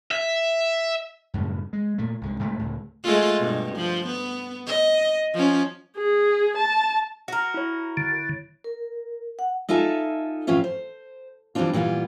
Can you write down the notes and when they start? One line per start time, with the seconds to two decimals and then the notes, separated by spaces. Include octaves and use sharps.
0.11 E5
1.34 F#2 A2 C#3 G3
1.73 G#3
1.98 A#2 A3
2.21 C2 G#2 D3
2.39 C2 G#2 F3 A3
2.59 C#2 A2 D3
3.04 G#3 A3 F4
3.39 G2 B2
3.76 F3
4.07 B3
4.67 D#5
5.34 F3 C#4
5.97 G#4
6.57 A5
7.28 F#4 A#4
7.54 E4 C#5
7.97 D3
8.64 A#4
9.39 F#5
9.69 D#4 F4 A4 E5 G#5 A5
10.47 A2 E3 C#4 F4 E5
10.64 C5
11.55 E3 G3 A#3 C4 D4 F4
11.73 A#2 E3 G3 B3 F4